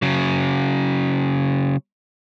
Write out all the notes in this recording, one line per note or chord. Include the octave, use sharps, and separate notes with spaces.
C#3 F#3